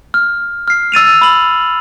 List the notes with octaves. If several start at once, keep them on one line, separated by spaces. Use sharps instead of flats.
F6
F6 C7
E6 A6 D#7 F7
B5 F#7